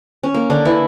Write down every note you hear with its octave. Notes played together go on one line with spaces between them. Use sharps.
C#4
A#3
D3 D4
E3 E4